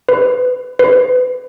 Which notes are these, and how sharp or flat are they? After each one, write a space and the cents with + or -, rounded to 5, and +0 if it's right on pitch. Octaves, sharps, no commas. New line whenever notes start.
B4 +25
B4 +30